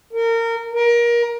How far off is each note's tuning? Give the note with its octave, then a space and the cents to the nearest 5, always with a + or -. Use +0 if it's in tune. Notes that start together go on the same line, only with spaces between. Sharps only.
A#4 -25
A#4 +25